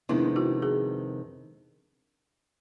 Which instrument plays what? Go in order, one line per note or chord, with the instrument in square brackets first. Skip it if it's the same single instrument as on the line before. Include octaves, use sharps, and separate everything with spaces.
[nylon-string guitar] F2 C3 D#3 G#3 B3 [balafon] D4 E4
[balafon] E4 F#4
F#4 G#4